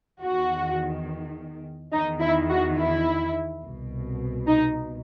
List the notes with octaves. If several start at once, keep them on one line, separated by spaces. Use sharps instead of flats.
E2 D#3 F#4
E2 D#3 D#4
E4
F#4
E4
C2 B2
D#4